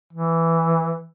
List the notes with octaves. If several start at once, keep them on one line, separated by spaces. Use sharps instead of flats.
E3